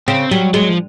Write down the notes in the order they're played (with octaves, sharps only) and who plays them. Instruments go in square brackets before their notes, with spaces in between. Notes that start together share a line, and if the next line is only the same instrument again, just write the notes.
[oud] C#3 [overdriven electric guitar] C4
[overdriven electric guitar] F#3 [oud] G3
[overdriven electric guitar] F#3 [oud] G#3
[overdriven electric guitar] F3